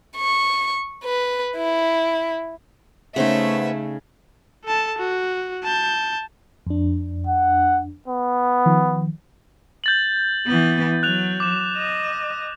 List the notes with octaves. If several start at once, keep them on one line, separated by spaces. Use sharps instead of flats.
C#6
B4
E4
C#3 A3 B3 C#4 D#4 C5 E5
A4 A5
F#4
A5 G6
F2 D4
F#5
B3
D#3 F3
G6 A6 F#7
E3 B3
F#3 F#6 F7
D6 E7
D#5